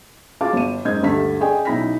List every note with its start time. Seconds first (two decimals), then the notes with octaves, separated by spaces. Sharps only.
0.41 F4 F#4 G#4 F5 A5 D6
0.53 G1 D#7
0.85 F#1 G#2 D#5 G6 G#6
1.03 D2 G2 A4 B6
1.40 G#4 D5 D#5 G5 G#5
1.65 B1 D#4 E4 B5 A#6 B6